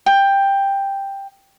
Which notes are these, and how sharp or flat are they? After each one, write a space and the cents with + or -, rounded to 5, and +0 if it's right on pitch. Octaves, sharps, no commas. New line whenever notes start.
G5 +10